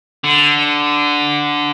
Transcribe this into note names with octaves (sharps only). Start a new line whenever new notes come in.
D3